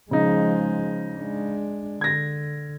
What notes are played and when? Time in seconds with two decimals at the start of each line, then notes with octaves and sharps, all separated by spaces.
0.11 C#3 F3 G#3 D#4
1.16 G#3 D4
2.01 D3 G#6 A#6